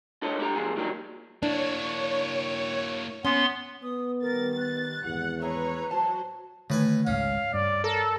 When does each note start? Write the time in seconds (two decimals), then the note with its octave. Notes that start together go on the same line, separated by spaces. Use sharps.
0.22 D4 F4 A4 C5 C#5 D#5
0.39 D4 E4 G4 A4 A#5
0.55 B2 F3 F4 G#4
0.76 D#3 F#3 G3 A#3 D4 D#4
1.43 A#3 D4 E4 C#5
3.25 B3 C#4 C6
3.83 B3 D#6
4.22 D#3 G3 A#4 A6
4.58 F#6
5.05 G#1 E2 F#5
5.42 A3 G#4 B4 C#5 A#5
5.91 F#3 C5 A5
6.70 A2 D3 D#3 B4 G#5
7.07 G#1 C#2 G#2 C#4 F5
7.54 G2 D5
7.84 A4 A#4